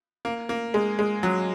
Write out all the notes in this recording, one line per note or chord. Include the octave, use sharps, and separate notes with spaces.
A#3
A#3
G#3
G#3
F#3